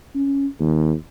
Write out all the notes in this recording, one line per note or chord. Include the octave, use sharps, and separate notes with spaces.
C#4
D#2